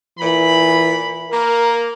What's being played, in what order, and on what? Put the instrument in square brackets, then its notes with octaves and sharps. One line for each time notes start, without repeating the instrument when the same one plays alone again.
[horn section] A#2 B5 [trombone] E3
[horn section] A#3 [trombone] A#4